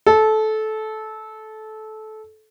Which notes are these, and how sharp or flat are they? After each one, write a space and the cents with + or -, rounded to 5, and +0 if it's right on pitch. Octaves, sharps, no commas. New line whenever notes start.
A4 -20